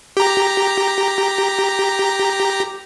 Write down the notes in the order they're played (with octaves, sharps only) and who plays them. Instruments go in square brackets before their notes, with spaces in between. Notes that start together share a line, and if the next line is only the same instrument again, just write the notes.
[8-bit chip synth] G4 A#5